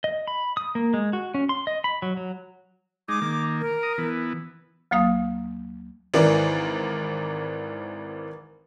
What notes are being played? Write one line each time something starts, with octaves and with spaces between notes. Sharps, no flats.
D#5
B5
D#6
A#3
G#3
F#4
C#4
C6
D#5
B5
F#3
F#3
G#3 D#4 D6
D#3 A#3
A#4
A#5 D#6
E3 B3
D2 F#3 A#3 F5 D#6
G#1 E3 A#4 D5